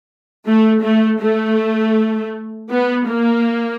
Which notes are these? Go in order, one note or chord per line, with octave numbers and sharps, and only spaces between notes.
A3
A3
A3
B3
A#3